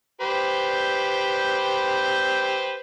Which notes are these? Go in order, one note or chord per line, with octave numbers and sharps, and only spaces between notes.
G4 B4 C5